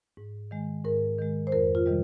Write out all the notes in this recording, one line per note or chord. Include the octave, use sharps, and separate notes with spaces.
G#2
D#3 G#3
G#2 A#4
D#3 G#3
C5
F2 A#4
F4
C3 D#3 G3